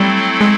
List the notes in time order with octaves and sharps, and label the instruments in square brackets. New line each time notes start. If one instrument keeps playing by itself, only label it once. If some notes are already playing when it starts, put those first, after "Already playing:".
Already playing: [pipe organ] F#3 A3 C4 E4 A4 [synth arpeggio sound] G3
[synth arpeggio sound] G#3